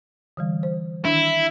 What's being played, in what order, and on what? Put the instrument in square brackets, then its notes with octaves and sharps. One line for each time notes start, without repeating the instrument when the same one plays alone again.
[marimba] D3 E3 G3
C5
[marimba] D#3 D4 [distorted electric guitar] E4